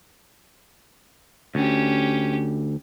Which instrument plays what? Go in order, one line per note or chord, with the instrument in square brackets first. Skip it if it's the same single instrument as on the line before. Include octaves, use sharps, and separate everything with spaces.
[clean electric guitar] D2 [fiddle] C#4 G4